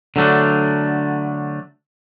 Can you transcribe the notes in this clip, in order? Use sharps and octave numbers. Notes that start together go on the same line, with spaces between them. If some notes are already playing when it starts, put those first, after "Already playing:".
D3 F#3 A3 D4